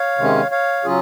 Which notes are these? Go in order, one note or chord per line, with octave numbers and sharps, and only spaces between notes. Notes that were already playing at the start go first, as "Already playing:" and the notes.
Already playing: C#5 F5
C3 D#3 G#3 C#4
C#5 F5
C#3 F#3 C#4 F4 G#4